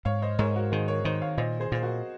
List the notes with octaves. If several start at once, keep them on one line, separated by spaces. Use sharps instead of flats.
G#2 C#5 F5
C5 D#5
G#2 A#4 C#5
F#4 A#4
D#3 G#4 C5
A#4 C#5
D#3 C5 D#5
C#5 F5
A#2 C5 D#5
G#4 C5
A#2 C5
F#4 A#4